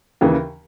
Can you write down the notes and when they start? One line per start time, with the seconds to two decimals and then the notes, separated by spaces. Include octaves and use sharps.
0.21 D#2 C#3 E3